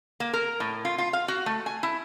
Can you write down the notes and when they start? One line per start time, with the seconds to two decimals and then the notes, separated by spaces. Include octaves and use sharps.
0.20 A#3
0.33 A#4
0.60 A2
0.85 F4
0.98 F4
1.13 F5
1.28 F#4
1.46 A3
1.66 G#5
1.83 E4